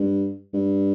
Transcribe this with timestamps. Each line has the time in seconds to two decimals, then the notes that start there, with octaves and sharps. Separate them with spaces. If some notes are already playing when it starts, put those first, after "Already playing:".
Already playing: G2
0.54 G2